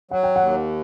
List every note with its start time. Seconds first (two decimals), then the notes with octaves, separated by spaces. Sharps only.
0.11 F#3 F#5
0.23 G5
0.36 D#2 F#5